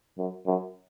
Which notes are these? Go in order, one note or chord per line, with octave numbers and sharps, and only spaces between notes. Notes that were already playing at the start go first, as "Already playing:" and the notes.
F#2
F#2